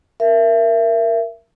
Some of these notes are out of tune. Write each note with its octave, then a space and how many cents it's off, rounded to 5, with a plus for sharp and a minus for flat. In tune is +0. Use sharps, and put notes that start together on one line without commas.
A#4 +0 E5 +25